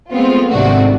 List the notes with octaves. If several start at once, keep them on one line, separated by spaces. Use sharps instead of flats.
G#3 A3 B3 C4 F4
G#1 G#2 C3 A3 D4 F#4